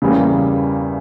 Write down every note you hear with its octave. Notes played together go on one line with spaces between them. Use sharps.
E2 C#3 E3 G3 A#3